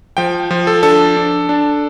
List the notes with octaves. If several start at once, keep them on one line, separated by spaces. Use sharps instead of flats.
F3 G5
F3
A4
D4 A4
D4
D4